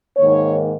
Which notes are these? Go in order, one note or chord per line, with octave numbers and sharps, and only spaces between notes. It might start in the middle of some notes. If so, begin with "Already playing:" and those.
G#2 D#3 A#3 C#5